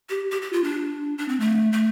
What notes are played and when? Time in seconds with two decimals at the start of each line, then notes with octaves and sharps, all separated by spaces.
0.10 G4
0.32 G4
0.42 G4
0.53 F4
0.64 D4
1.18 D4
1.28 C4
1.40 A3
1.72 A3